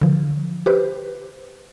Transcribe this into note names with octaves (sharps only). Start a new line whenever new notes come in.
D3 F3
G4 B4 C5